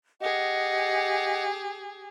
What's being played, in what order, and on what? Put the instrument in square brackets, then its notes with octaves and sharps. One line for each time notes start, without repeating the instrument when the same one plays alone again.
[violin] G4 G#4 [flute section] D#5 F#5